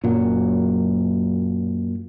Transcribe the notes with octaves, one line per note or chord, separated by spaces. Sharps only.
F#2 A#2 F#3